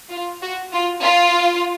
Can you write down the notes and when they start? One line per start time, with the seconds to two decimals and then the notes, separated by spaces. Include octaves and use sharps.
0.10 F4
0.42 F#4
0.73 F4
1.03 F4